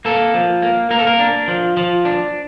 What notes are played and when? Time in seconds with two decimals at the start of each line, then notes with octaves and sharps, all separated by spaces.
0.05 A#3 A4
0.34 F3
0.62 A#3
0.91 A#3 A#4
0.99 A4
1.07 A#4
1.19 D4
1.48 F3
1.77 F3
2.05 D4